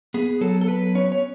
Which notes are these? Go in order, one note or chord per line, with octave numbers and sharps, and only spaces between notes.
B3 G#4
F#3 A4
A4
B3 B4
C#4 C#5
C#5